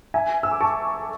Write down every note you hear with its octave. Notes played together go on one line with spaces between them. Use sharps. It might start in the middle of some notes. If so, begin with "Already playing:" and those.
E5 G#5
E6
D6
A5 C#6